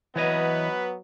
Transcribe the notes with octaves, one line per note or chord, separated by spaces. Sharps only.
E3 F#3 B3 B4 C#5 D#5